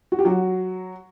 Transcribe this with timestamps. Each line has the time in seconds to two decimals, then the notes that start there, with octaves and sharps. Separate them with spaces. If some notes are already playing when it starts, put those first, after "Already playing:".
0.12 F#4
0.19 G4
0.25 F#3 F#4